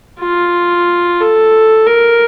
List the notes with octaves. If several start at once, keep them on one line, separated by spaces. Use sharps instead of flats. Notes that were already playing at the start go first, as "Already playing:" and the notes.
F4
A4
A#4